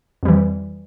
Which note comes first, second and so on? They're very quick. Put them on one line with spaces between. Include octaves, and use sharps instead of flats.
F2 G3 E3